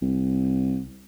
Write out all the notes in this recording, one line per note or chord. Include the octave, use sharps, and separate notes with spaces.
C2